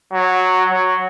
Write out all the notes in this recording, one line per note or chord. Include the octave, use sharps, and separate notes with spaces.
F#3
F#3